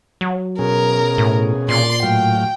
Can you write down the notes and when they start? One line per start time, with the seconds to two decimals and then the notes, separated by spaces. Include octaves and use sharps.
0.21 F#3
0.59 B2 C#4 G#4 A#4
1.18 A2
1.69 A#2 D5 C6
2.03 A2 F#3 F5 G5